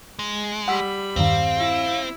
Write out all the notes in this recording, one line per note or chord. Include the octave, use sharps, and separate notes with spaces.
G#3
G3 F#5 B5 E6 B6
E2 G2 D#3 C4 F5
E4